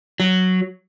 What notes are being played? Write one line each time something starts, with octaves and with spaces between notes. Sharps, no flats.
F#3